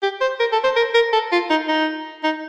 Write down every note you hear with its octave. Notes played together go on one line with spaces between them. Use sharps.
G4
C5
A#4
A4
C5
A#4
A#4
A4
F4
D#4
D#4
D#4